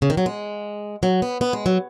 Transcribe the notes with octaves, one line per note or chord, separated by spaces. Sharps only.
C#3
D#3
F#3
G#3
F#3
B3
B3
G#3
F#3